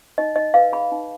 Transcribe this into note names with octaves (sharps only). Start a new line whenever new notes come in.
D#4 D#5
D#4 D#5
B4 F5
G#4 B5
D#4